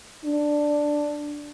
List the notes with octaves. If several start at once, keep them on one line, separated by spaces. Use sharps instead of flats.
D4